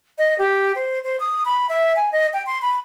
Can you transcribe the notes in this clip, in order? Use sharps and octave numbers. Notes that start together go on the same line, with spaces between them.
D#5
G4
C5
C5
D#6
B5
E5
G#5
D#5
G5
C6
B5